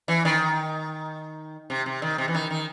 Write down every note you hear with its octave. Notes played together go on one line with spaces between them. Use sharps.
E3
D#3
C3
C3
D#3
C3
E3
D#3
D#3